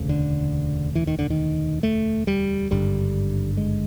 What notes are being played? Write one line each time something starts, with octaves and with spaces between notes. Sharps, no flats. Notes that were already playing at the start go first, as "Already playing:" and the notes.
Already playing: E1 D2 C#3
D3
E3
D#3
D3
D#3
A3
G3
G#1 G2 D3 G3
G#3